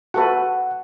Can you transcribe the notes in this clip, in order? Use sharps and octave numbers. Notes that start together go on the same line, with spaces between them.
F#4 A4 B4 F#5